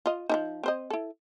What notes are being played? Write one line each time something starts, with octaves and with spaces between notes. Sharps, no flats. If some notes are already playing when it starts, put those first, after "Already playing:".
F4 D#5
F3 D4 D#4
C4 C5 D#5
E4 A4